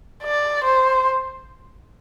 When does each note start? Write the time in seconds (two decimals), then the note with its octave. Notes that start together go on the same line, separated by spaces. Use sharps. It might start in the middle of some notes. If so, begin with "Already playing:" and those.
0.23 D5
0.64 C5